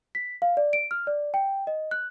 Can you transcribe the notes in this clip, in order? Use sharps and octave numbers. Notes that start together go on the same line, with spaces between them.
B6
F5
D5
D7
F6
D5
G5
D#5
F#6